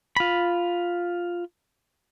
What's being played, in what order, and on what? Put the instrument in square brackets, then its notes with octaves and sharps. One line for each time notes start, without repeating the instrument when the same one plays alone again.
[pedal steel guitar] F4 B5